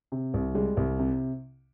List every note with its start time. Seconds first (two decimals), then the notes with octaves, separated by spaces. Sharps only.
0.12 C3
0.34 C2
0.55 G3 G#3
0.77 C2
0.99 C3